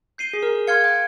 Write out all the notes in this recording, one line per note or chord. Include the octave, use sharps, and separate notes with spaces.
G6 C7 D#7 G7
G#4
A#4
F5 C6 F6 G#6 C#7
G5